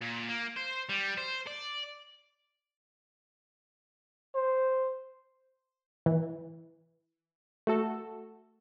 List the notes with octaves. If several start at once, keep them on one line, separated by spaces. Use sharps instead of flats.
A#2
A#3
C5
G3
C5
D5
C5
E3
A3 F#4 A4